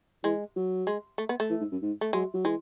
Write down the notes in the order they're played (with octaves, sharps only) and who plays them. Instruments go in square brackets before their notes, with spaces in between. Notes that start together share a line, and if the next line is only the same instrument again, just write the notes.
[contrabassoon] E3 [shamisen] G#3
[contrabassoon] F#3
[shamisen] G#3
A3
B3
A3
[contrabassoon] E3
G#2
F#2
G#2
[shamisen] A3
[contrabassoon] F#3 [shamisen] G#3
[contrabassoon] F#3
[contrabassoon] E3 [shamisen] G#3